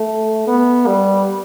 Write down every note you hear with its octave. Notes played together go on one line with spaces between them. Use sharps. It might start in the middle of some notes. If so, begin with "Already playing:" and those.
Already playing: A3
B3
G3